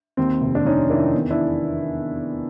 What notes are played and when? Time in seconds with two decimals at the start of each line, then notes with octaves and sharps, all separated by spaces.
0.17 D#2 C4
0.41 F1
0.55 D4
0.65 F1 C#4 D#4
0.90 D#3 D4 E4
1.15 E2
1.30 D4 E4